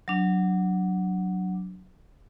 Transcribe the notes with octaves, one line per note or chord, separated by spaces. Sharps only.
F#3 D4